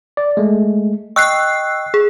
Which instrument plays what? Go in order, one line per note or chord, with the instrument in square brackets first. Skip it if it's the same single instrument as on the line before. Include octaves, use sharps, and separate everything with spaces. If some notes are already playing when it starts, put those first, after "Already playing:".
[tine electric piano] D5
G#3 A3
[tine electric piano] D#5 G5 C#6 [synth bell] E6 F#6 C7
[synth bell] G#4